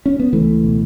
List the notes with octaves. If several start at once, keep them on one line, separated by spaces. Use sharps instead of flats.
C#4
B3
C#2 E3 A3
B2